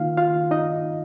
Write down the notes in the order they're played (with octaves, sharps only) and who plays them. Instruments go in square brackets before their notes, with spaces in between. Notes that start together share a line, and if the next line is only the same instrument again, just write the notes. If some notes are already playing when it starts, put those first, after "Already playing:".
Already playing: [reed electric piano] D#3 A#3 D#4 F4 F5
F4 F5
D#4 D#5